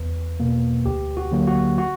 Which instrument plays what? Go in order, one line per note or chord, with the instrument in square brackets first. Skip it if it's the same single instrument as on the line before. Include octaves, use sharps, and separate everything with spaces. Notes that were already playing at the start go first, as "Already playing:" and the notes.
Already playing: [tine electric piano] E2 B4
B2 A#3
D2 G4
F#4
D3 F#3 A#3
F#4
F#4